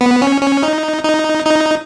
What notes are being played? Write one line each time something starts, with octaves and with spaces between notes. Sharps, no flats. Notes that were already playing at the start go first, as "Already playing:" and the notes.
B3
C#4
C#4
D#4
D#4
D#4